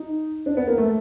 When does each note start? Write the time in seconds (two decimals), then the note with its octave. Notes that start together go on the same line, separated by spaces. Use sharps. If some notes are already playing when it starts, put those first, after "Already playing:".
Already playing: D#4
0.46 D4
0.57 B3
0.67 A#3
0.78 A3